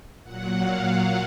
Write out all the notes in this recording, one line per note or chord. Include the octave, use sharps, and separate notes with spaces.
A#2 F#3 F#5
F5
F#5